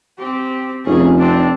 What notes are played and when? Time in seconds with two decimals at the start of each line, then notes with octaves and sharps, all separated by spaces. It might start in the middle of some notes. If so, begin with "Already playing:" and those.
0.19 C4 G4
0.86 F1 C#4 G#4
1.18 C4 D4